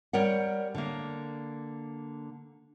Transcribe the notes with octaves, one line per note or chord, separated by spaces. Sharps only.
G3 A#4 C#5 F#5
D3 A#3